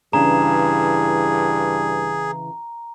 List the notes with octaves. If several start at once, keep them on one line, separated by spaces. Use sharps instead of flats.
G2 C#3 E3 D4 G#4 A#5